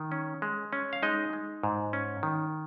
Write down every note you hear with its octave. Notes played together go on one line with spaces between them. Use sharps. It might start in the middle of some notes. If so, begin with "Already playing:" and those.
Already playing: D#3
C#4
G#3
C#4
F5
G#3 D#4 D#5
G#3
G#2
C#4
D#3